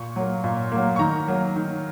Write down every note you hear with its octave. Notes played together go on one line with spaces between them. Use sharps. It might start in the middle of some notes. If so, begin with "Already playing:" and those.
Already playing: A#2 C#6
F#3 A#3
A#2
F#3 A#3
C#6
D#3 A#5
F#3 A#3
D#3